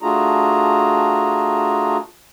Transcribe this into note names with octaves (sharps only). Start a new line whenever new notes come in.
A3 D4 F4 F#4 G#4 A#5